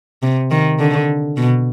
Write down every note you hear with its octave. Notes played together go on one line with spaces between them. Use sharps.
C3
D#3
D3
B2